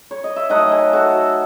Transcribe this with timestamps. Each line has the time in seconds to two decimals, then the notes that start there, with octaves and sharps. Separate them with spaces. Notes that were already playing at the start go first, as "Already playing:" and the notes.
Already playing: B4
0.11 C#5
0.24 D#5
0.36 E5
0.50 D#3 F#3 A3 D#5 F#5
0.72 E5 G#5
0.93 F#4 A4